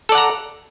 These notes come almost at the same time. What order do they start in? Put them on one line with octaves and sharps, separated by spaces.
A4 D5 F#5 A#5